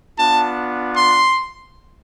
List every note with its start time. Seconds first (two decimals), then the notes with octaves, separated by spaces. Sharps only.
0.18 B3 D4 F4 A5
0.96 C6